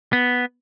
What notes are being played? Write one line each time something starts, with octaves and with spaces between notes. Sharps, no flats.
B3